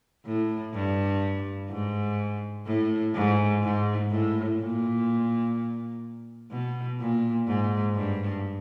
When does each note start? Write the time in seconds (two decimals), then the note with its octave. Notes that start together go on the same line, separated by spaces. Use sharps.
0.26 A2
0.74 G2
1.69 G#2
2.66 A2
3.14 G#2
3.62 G#2
4.10 A2
4.59 A#2
6.50 B2
6.99 A#2
7.47 G#2
7.95 G2